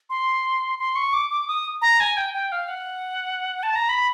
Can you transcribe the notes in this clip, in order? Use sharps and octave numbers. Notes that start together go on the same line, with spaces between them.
C6
C6
C#6
D6
D6
D#6
A#5
G#5
G5
G5
F5
F#5
A5
A#5
B5